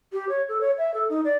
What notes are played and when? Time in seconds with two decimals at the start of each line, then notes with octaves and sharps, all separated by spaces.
0.12 G4
0.29 C#5
0.48 A4
0.61 C#5
0.78 E5
0.94 A4
1.09 D#4
1.24 D5